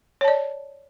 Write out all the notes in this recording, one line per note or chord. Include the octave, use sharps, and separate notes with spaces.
C#5 D5 A5